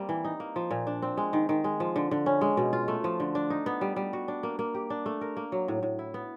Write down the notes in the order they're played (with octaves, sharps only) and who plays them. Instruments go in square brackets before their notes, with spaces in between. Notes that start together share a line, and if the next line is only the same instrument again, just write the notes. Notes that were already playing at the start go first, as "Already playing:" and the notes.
Already playing: [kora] G3 A#3 C4
E3
D#4
A#3
F3
A#2
D4
C4
G#3
D#3
D#3
G#3
F3
D3
D3
C#4
G#3
B2
F4
A3
F3
D3
D4
D#4
B3
G3
G3
F#4
D4
A#3
A#3
G4
D4
A3
A#4
A#3
F#3
A2
A2
E4
B3